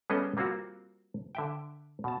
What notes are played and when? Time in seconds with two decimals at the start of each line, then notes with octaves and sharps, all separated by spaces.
0.10 G3 B3 C#4 G#4 A4 D#5
0.37 G3 A#3 C4 F4 F#4
1.35 D3 E5 G5
2.04 B2 A5